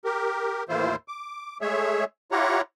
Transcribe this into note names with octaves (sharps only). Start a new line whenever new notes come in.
G4 A#4
D#2 A2 E3 E4 F4 C5
D6
G#3 A3 G#4 C#5 E5
E4 F4 G4 C#5 F#5 A#5